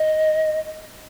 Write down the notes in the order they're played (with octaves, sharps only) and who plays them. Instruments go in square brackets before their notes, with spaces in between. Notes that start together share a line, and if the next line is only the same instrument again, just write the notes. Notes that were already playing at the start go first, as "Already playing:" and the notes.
Already playing: [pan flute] D#5